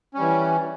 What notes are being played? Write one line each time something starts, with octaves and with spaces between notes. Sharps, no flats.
E3 G3 C#4